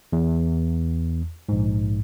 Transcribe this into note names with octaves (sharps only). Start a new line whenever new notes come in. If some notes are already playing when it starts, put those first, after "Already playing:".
E2
A#1 G#2